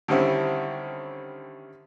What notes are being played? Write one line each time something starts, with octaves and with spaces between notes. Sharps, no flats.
D3 D#3 G3 C4 C#4 E4